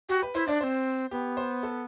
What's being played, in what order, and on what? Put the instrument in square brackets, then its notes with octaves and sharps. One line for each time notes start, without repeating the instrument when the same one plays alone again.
[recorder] F#4 [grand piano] G4
[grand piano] B4
[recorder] E4 [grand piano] C5
[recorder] D4 [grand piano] D5
[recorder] C4 D4 [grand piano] C5
[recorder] B3 [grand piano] G4
[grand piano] C5
A4